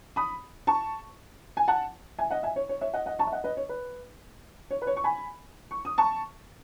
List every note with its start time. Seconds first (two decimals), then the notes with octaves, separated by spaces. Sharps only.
0.16 B5 D#6
0.67 A5 C#6
1.57 G#5
1.68 F#5 A5
2.18 E5 G#5
2.30 D#5 F#5
2.43 E5 G#5
2.56 C#5
2.69 C#5
2.81 C#5 E5
2.93 D#5 F#5
3.06 D#5 F#5
3.19 A5 C#6
3.27 E5
3.32 D#5 F#5
3.44 B4 D#5
3.57 C#5
3.69 B4
4.71 C#5
4.82 B4
4.87 C#5
4.97 C#6
5.04 G#5 B5
5.71 C#6
5.85 D#6
5.98 A5 C#6